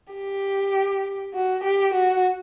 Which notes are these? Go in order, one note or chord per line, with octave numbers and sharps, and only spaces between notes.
G4
F#4
G4
F#4